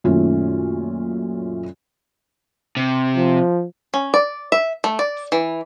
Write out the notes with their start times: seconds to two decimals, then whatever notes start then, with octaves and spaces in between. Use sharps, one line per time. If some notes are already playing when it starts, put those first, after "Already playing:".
0.04 F#2 A#2 D#3 A3 C#4 F4
2.77 C3
3.17 F3
3.94 C#4
4.14 D5
4.52 E5
4.84 A3
4.99 D5
5.32 E3